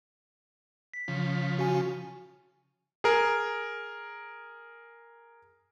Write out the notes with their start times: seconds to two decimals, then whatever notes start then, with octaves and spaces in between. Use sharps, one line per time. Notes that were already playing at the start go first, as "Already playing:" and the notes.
0.94 B6
1.08 C#3 F3
1.59 F#4 G#5
3.04 G#4 A#4